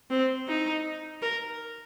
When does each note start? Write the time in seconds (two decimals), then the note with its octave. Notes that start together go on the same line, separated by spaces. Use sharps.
0.10 C4
0.48 D#4
1.22 A#4